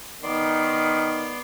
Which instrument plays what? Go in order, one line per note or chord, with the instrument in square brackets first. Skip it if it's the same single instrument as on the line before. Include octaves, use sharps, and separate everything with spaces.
[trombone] D#3 [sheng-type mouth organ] B3 D5 C6